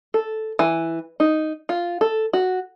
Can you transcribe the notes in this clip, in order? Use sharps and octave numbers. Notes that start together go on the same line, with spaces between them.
A4
E3
D#4
F4
A4
F#4